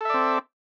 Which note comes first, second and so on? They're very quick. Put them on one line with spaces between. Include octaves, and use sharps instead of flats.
A4 E5 D5 C4